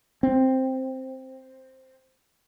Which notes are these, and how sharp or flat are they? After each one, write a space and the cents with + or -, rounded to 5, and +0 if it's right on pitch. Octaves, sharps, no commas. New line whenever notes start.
C4 +5